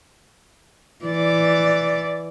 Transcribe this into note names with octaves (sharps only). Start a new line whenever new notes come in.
E3 D5